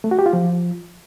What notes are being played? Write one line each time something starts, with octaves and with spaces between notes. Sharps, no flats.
A3
F#4
G4
F4
F3